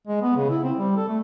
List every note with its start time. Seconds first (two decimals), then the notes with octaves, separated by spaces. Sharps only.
0.08 G#3
0.22 B3
0.37 C#3
0.50 E4
0.64 C4
0.77 G3
0.97 A4
1.09 A3